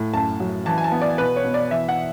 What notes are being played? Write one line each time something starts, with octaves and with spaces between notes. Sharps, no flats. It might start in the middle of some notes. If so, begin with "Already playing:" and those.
Already playing: A2
F#2 A5
F#3
E3 A5
G#5
A5
B3
D5
B2 B4
C#5
B2
D5
E3 E5
F#5